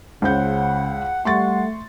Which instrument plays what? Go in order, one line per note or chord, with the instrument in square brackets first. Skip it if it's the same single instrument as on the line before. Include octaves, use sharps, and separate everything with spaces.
[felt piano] C#2 C5 G6 [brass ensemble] C#3 [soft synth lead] F#5
[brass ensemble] G3 F#5 [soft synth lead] A3 [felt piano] C6 C#6 A6